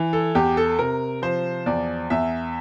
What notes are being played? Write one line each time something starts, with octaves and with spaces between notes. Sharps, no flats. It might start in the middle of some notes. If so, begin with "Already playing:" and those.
Already playing: E3
A4
E2 G4
A4
C3 A#4
F3 C5
E2 D5
E2 E5